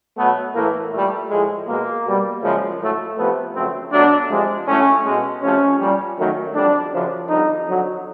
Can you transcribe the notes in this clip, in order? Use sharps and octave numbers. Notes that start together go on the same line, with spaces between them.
B2 F#3 A3 B3
A2 E3 A3 A#3
A#2 G3 A3
A2 F3 G#3
B2 G#3 A#3
B2 G3
F#2 C#3 F3 G#3
A2 F#3 A3
C3 F3 A3 B3
F2 C#3 F#3 A3 C4
B2 F#3 A3 D4
C3 F3 G#3
A2 F#3 A3 C#4
B2 G#3
C3 F3 A3 C#4
A#2 G3
F#2 D#3 F#3 A3
F2 D3 G3 D4
F#2 C#3 F3
F2 D3 G3 D#4
F2 D3 F#3